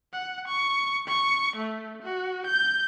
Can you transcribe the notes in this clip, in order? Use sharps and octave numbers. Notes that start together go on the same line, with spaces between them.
F#5
C#6
C#6
A3
F#4
G6